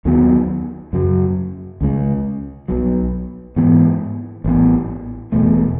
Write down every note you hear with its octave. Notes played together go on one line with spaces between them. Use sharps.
D#2 D#3 F#3 B3
F#2 C#3 F#3
C#2 C#3 G#3
B1 B2 F#3
G#2 E3 B3
A1 A2 E3 B3
E1 E2 B2 A3